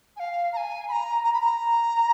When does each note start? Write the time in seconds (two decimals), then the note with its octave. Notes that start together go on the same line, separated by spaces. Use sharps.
0.16 G#5
0.19 F5
0.52 A#5
0.56 G#5
0.88 B5
0.91 A#5
1.23 A#5
1.33 B5
1.41 A#5